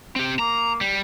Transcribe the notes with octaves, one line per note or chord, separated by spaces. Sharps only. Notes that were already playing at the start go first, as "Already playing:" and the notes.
C4 G4
A#3 A#5
G3